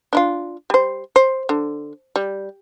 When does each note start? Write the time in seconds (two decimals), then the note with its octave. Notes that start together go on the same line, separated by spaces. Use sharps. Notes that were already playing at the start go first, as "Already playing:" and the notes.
0.13 D4 E4 F4
0.70 G3 C5
1.16 C5
1.49 D3
2.16 G3